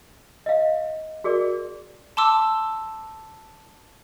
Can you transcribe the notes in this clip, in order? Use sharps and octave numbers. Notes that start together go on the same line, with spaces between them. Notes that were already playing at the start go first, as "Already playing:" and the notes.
D#5 F5
F#4 G#4 A#4 D5
A5 C6 D6 E6